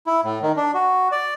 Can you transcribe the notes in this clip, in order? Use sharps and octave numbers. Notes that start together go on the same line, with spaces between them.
E4
A2
D#3
D4
F#4
D5